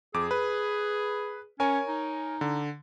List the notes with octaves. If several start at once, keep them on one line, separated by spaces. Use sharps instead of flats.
F2 G#4 D6
B4
C#4 A#4 C#5 G#5
D#4
D3